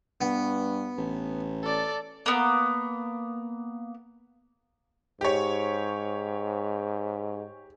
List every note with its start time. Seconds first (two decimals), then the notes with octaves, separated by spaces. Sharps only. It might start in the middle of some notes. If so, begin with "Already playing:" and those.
0.21 G2 B3
0.98 A1
1.62 A4 D5
2.26 A#3 B3
5.21 G#2 G4 C#5